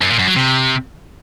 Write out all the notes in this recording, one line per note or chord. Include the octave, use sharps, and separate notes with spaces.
F#2
A#2
F#2
F#3
C3